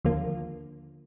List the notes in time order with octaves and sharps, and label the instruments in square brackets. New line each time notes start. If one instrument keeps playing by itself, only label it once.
[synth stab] D#2 D3 F3 A#3 F4